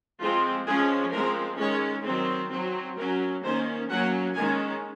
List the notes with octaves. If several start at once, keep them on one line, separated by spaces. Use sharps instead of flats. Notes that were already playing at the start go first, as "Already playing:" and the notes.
F3 G#3 C4 F4
F3 G#3 C#4 G#4
F3 G#3 C4 A#4
D#3 G#3 C#4 C#5
D#3 F#3 C4
F#3 C4
F#3 C#4 A#4
D#3 A#3 C#4 C5
F#3 A#3 C#4 F#5
D#3 G#3 C#4 G#5